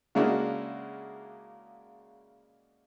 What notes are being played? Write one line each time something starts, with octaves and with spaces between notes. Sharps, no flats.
C#3 G#3 A#3 D4 E4 F#4